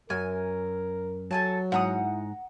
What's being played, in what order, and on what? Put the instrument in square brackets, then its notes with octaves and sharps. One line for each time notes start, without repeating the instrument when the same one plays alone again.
[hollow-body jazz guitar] F#2 [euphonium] A#4 [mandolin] G#5
[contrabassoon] F#3 [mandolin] A4 G#5 A5
[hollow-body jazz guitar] G#2 [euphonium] E4 [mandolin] F#5 A#5 D#6